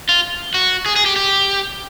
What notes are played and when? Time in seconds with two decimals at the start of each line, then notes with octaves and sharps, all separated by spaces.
0.09 F4
0.54 F#4
0.86 G#4
0.96 G#4
1.06 G4
1.16 G4